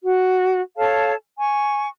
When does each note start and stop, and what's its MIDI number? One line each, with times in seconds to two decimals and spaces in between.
0.03 0.62 66
0.77 1.14 69
0.77 1.14 73
0.77 1.14 77
0.77 1.14 81
1.37 1.86 80
1.37 1.86 85